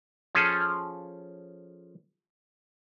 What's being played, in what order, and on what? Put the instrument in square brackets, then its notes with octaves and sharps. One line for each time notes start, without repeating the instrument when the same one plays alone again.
[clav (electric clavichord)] F3 C#4 G#4 A4